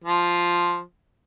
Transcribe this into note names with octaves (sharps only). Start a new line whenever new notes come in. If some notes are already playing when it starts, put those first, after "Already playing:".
F3